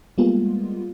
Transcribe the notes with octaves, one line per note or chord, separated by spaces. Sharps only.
G3 G#3 A#3 B3 F4